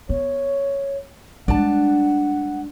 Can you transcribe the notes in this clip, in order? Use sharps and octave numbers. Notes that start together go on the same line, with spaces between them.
B3 C#5
G3 G#3 D4 F#5 A5